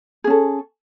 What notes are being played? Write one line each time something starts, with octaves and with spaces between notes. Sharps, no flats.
C#4 G#4 A4